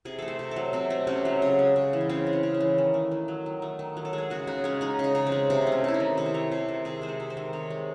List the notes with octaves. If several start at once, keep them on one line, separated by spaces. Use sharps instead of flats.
C3 G#4
A3 A4
C5
C3
F#3 A4
C3 C4
A3
C3 C#4
F#3
C#3
G#3
C#3
E3
C#4
C#3 C4
G#3
C#4
C#3
C#4
E3
D#3
A3
D#3
F#3
D#3
A3
D#3
F#3
A4
G#3
G#4
C#3 F#4
C#3 D#4
G#3 C#4
G#3 D#4
C#3
D#4
C#3
C4
G#3
C3 D#4
A3
C#4
C3 E4
D#4
D#3
C3 E4
C5
A3 C#5
C3 C5
D#3 A4
C3 G#4
G#3 C5
A4
C3
C5
D#3
C3 C#5
G#3